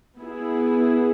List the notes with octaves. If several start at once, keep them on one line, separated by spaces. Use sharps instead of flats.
B3 E4 G#4